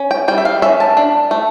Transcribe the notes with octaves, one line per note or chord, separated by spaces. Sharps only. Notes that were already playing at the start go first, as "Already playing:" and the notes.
Already playing: C#4
G5
G3 G5
E5
F5
C#4 E5
A5
D4
A3